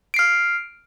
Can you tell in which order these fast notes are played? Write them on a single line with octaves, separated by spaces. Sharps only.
D7 C7 F6